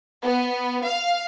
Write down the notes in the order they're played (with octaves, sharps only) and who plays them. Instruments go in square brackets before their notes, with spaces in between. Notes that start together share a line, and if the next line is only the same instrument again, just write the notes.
[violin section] B3
F5